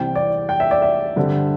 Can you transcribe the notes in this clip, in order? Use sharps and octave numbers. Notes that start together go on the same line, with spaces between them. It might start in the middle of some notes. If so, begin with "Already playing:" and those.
Already playing: C2 C3 E3 C4 G5
D5
G5
E5
D5
E5
G2 D3 C4